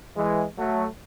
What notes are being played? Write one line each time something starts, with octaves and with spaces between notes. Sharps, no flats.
E3 G#3
F#3 A3